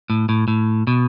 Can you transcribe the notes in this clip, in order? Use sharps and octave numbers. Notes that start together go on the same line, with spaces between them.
A2
A2
A2
B2